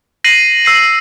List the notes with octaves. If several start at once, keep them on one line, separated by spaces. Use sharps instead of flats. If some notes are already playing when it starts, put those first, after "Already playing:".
A#6 C7 D#7 F#7
E6 C7 D#7